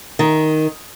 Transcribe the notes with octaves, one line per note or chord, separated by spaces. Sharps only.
D#3